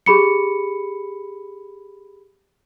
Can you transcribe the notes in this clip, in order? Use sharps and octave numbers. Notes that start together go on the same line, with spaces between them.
G4 G#4 B5 C#7